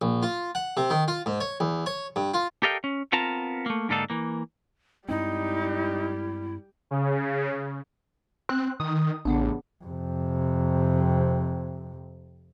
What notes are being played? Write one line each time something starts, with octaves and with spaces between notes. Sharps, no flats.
A#1
F4
F#5
C3
D#3
F4
G#2
C#5
E2
C#5
G2
F4
G4 A4 A#4 D#5 F5 G5
C#4
B3 C4 F4 A#4 A5 A#5
A3 A#3
G#2 D3 A#3 D4 D#4 A4
E3 A#3
G2 G3 G#3 C4 D#4 E4
C#3
C4 F#6
D#3 D#6
A1 C#3 B3 D4
F2 C3